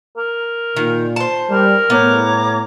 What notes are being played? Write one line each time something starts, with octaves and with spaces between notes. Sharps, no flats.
A#4
A#2 D#3
C5 A5
G3 A#4
A2 B3 C#5 A#5 D6